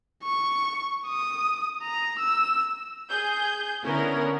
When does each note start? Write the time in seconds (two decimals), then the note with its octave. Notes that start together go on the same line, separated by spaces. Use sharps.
0.23 C#6
1.07 D#6
1.83 A#5
2.20 E6
3.10 G#4 G6
3.84 D3 B3 C#4 E4 A#4